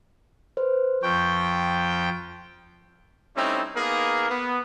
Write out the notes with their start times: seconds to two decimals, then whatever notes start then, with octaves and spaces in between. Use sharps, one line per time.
0.57 B4 C5
1.03 F2 G5 C#6 G6
3.36 G3 A3 C4 C#4 D#4 E4
3.75 A#3 B3 D#4 G#4 A#4
4.30 B3